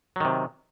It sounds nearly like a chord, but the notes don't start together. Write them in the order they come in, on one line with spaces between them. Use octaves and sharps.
F#3 D#3 C3